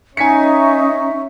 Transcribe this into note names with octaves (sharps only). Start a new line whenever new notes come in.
C#4 D#4 E5 G#5 C#6 B6 C#7